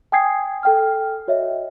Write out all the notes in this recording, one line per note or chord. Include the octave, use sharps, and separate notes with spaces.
G5 G#5 D#6 G#6 C7
A4 G5 F6
F#4 C#5 D#5 E5